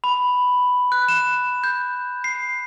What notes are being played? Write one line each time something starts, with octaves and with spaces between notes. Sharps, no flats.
B5
F#6
E7
G6
C7